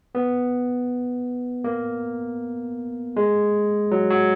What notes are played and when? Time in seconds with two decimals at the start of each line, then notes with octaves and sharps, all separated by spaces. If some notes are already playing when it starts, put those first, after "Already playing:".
0.15 B3
1.64 A#3
3.16 G#3
3.91 F#3
4.10 F#3